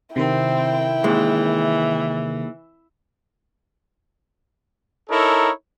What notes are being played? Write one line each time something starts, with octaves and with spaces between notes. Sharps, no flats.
C3 D#3 C4 E4 A#4 G5
D#2 E3 G#3
D#4 E4 A4 A#4 C#5